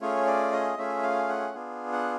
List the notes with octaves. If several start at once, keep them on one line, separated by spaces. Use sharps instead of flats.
A3 C#4 F4 G#4 C#5
D5
D#5
A3 C#4 F4 G#4 E5
F5
F#5
B3 D4 F4 G#4
F#5